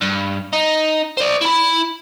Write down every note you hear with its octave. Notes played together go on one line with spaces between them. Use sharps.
G2
D#4
C5 D5
E4 B5